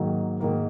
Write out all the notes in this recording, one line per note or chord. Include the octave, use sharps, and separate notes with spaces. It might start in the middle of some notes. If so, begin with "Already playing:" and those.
Already playing: G#2 D#3 F#3 A#3
G#2 D#3 A#3